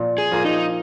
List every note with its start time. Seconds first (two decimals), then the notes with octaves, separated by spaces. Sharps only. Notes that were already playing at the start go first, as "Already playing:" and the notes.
Already playing: A#2 F3 A#3
0.18 G#4
0.31 F3 A#3 F4
0.45 D#4